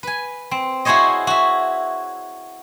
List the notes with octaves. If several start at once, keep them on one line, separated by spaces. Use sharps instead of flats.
B4 G#5
C4
E4 F#4 G#4 C5 C#5 D#5
F#4 E5